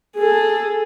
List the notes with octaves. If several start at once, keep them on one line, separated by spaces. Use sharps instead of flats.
G#4 A4